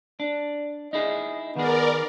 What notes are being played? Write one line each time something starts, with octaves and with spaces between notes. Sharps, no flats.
D4
D#4 E4 G#4 D#5
D#3 B3 G#4 A#4 D5